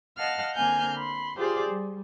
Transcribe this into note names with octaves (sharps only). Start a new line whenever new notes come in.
D#5 F5 F#5 A5 F6
D3 A#3 C4 G#5 F6 G6
B5 C6
F4 G4 G#4 C5 D5
G3